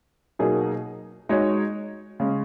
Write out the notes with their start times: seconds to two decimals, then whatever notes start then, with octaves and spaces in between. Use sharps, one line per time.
0.39 B2 F#3 A#3 D#4 G#4
1.29 G#3 D#4 F#4 C#5
2.20 C#3 G#3 C#4